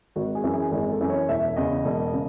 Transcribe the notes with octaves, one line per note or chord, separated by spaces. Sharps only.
G#1 F#4
G#4
F#2 E3
G#4
G#1 G#4
A4
F#2 E3
C#5
E1 E5
E2 C#3 D#5
E1
C#3